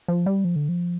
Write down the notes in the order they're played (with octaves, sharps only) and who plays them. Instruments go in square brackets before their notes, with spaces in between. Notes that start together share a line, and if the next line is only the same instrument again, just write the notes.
[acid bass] F3
G3
F3
D3
F3